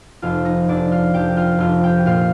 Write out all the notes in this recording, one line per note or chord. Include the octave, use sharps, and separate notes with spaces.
F1 F4 F5
D#4 D#5
F1 D4 D5
F4 F5
F1 G4 G5
F4 F5
F1 F4 F5
G4 G5
A#2 F4 F5